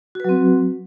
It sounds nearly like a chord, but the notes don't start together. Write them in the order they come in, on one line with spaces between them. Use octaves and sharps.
F#4 B4 F#3 C4